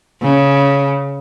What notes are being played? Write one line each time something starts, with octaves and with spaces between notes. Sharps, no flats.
C#3